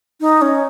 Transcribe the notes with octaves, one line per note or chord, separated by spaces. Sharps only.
D#4
C#4